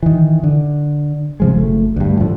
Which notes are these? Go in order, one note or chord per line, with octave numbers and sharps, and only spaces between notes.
D#3 E3
D3
C3 F3 G#3
F#1 A3
D2 G2
A2 D3 F3